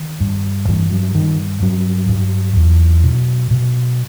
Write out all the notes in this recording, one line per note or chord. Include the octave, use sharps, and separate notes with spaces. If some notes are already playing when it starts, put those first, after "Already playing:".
Already playing: D#3
G2
G2 E3
F#3
G2 D#3
G2 F#3
G2
E2
B2
B2